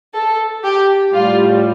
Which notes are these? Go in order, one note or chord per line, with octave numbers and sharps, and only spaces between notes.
A4
G4
A2 G3 F4